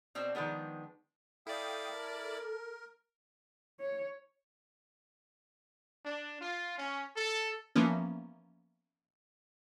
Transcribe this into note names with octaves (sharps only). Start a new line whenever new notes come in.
B2 C4 D4
D#3 F3 G#3 B3 D4
E4 A4 D5 F5 G5 D#6
A#4
C#5
D4
F4
C#4
A4
E3 F3 A#3 B3 C#4